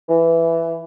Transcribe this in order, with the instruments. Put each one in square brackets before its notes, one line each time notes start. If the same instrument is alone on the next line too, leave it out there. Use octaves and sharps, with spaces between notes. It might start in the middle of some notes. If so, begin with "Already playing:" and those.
[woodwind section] E3